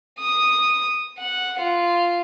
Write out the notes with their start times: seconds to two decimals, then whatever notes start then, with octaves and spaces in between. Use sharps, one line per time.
0.19 D#6
1.19 F#5
1.60 F4